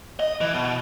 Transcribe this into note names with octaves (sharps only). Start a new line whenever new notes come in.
D#5
E3
B2